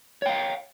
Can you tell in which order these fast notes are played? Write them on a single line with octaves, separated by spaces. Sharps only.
C#5 G5 F5